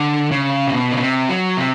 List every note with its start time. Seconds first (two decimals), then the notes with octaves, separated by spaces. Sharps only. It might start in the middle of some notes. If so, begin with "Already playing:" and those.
Already playing: D3
0.31 C#3
0.67 C3
0.73 B2
0.92 C#3
1.01 C3
1.29 F#3
1.57 C3